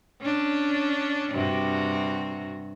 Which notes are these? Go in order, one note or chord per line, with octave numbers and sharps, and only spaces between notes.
C#4 D4
G2 C3 F#4